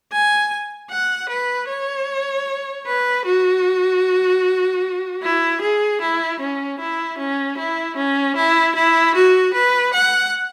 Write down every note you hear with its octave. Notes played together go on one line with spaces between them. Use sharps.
G#5
F#5
B4
C#5
B4
F#4
E4
G#4
E4
C#4
E4
C#4
E4
C#4
E4
E4
F#4
B4
F#5